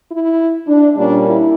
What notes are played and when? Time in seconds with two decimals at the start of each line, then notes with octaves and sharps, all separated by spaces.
0.10 E4
0.68 D4
0.96 A#2 G3 A#3 C#4 D4
1.25 E4